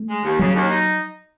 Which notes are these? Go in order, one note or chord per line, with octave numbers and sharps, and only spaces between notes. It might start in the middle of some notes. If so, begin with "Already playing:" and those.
Already playing: A3
G#3
D#2
C#3 F#3
D#2
D#4